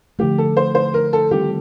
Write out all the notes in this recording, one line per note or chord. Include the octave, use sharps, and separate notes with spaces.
D3 F3 A3 G4
A4
C5
C5
A#4
A4
D#3 G3 C4 F4 G4